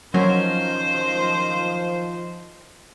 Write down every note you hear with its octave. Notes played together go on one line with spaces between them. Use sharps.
D#3 F3 F#3 C#4 A#4 C5